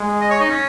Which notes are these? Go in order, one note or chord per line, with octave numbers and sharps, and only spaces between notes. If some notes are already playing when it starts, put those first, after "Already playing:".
Already playing: G#3
D#5
C#5
D#4
C#4